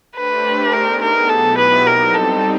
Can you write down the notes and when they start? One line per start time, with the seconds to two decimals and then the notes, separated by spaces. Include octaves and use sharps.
0.16 A3 D4 G4 B4 C5
0.73 B3 D#4 G#4 A#4
1.02 A#4
1.29 B2 F#3 B3 E4 G4 A4
1.58 B4
1.86 G3 C4 D#4 A#4
2.14 A4